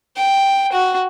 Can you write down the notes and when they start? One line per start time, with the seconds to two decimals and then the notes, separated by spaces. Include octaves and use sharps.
0.17 G5
0.72 F#4